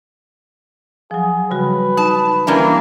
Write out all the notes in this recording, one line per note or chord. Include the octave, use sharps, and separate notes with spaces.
F3 F#3 G#4
C#3 G3 F#4 B4
D#4 A5
E3 G3 A#3 C#4 D4